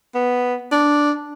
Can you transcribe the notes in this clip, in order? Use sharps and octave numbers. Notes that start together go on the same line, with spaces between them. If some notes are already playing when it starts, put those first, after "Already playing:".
B3
D4